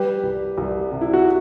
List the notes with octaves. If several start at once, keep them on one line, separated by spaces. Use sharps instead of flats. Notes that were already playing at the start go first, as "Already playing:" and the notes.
Already playing: G3 G4 B4
C2
C2
C3
E4
F#4